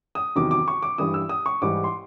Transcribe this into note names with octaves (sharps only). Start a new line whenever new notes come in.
D#6
E2 C3 D#3 F#3 D6
D6
C#6
D6
G2 E3 G3 D#6
E6
D#6
C#6
G#2 E3 G3 D6
C6